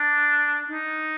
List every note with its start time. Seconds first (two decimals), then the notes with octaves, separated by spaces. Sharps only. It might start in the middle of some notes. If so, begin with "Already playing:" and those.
Already playing: D4
0.69 D#4